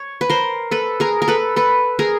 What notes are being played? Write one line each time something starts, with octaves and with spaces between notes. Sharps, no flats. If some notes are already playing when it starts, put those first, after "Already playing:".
Already playing: C#5
B4
A#4 C5
A4 B4
G#4 A#4
A#4
A4 B4
A4 B4
G#4 A#4